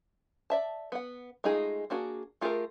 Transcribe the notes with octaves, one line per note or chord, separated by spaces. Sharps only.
D5 E5 A5
B3 F#5
G#3 A3 D#4 F4 G#4
A#3 D4 F#4 G#4
A3 F4 G4 G#4 A#4